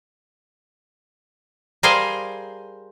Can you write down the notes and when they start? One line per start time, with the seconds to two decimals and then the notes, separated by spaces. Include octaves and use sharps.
1.83 G3 G#4 A#4 C5 F5 G#5